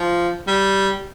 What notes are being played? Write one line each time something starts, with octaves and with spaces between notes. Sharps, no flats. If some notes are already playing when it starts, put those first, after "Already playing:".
Already playing: F3
G3